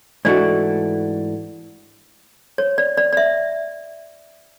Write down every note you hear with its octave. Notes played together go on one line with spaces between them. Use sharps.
G#2 E3 A3 D4 F#4 D5
C#5
D5
D5
D5
E5